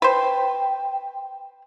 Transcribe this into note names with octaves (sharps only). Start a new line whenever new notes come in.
B4 C5 G5